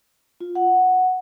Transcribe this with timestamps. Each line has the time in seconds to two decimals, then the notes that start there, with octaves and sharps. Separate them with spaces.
0.40 F4
0.55 F#5